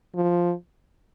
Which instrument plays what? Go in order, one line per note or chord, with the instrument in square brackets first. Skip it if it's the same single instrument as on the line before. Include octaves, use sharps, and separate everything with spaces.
[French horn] F3